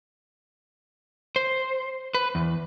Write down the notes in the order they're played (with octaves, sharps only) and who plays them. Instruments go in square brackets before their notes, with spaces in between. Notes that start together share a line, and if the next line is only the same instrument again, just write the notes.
[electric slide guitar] C5
B4
E2